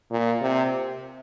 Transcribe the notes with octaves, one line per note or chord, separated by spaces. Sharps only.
A#2
C3